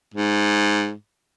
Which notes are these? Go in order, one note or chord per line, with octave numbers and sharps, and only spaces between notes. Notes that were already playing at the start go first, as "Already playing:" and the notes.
G#2